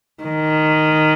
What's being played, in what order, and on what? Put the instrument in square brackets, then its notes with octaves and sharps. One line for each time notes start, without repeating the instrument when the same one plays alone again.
[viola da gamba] D#3